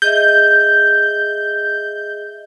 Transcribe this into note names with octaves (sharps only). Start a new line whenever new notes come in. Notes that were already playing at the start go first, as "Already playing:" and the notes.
G#4 D#5 E5 G6